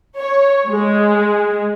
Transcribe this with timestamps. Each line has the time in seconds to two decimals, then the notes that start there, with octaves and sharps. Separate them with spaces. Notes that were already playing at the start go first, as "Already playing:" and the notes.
0.19 C#5
0.68 G#3